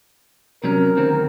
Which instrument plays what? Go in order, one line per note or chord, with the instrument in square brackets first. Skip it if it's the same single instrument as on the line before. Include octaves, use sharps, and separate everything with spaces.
[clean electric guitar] C3 F#3 C#4 [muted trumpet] A#4
[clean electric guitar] D2 D#3 C4